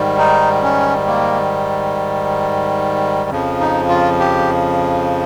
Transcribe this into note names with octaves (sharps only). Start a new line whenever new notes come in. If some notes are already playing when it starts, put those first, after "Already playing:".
Already playing: G#2 D#3 G3
D#4
C#4
A#3
F2 C#3 F3
D#4
F4
G4